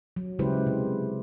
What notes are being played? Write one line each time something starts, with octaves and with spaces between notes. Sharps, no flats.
F#3
C#3 G#3 E4 G4 B4 C5
C3